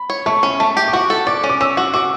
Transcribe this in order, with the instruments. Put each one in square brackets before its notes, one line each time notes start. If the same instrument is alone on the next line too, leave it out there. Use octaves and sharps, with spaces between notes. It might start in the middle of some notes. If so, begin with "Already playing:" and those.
Already playing: [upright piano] B5
[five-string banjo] C#5
[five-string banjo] A3 [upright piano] C#6
[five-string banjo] C#4
[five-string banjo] A3 [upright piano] A5
[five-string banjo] G4
[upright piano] D6
[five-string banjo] F#4 [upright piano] C#6
[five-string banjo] A4
[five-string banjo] D5 [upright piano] D6
[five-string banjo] C#4
[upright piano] D6
[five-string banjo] C#4 [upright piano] E6
[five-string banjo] F#4
[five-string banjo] F#4 [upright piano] D6